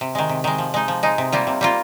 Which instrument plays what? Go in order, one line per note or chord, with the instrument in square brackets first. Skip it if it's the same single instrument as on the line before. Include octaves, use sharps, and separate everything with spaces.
[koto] C3
D#3 G#3
C3
D#3 G#3
F3
G#3 D#4
F3
G#3 D#4
C3
G3 A#3 F4
C3
G3 A#3 F4